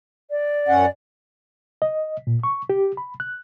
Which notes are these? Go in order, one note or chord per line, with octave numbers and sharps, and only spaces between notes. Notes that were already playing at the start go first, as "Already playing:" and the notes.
D5
F#2 C#4 F#5
D#5
A#2
C#6
G4
B5
F#6